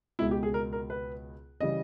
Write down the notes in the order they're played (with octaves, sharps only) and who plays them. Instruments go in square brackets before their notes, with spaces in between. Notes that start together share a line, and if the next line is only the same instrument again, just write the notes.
[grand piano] C#2 B2 G#3 E4
G4
G#4
A#4
A#4
B4
C#3 E3 G3 D#5